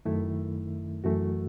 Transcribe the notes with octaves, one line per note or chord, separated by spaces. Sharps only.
F#2 D#3 A3 E4
F#2 E3 A3 F#4